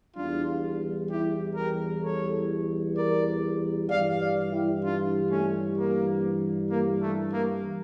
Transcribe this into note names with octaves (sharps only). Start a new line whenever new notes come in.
E2 E3 G3 D4 F4
E4 G4
G4 A#4
A4 C#5
A#4 D5
G2 E3 G3 D5 F5
D5 F5
E4 G4
D4 F4
A3 C#4
A#3
A#3
A3
A#3